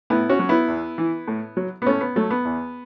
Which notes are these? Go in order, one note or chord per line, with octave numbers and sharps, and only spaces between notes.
A2 B3 E4
C#4 F#4
F#3
B3 E4
E2
E3
A2
F#3
B3
A2 A3 C#4
B3
F#3 A3
B3
E2